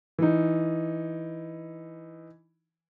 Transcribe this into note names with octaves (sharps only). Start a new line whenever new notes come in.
E3 D#4